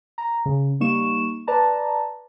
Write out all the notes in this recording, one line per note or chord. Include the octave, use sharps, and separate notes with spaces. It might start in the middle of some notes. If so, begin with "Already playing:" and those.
A#5
C#3
G3 A#3 D#4 C#6 E7
B4 D5 A5 A#5